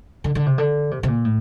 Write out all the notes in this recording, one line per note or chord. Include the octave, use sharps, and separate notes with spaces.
D3
D3
C3
D3
C3
C3
A#2
A2